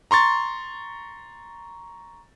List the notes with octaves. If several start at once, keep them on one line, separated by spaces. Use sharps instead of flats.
A#5 C6 C#6 A6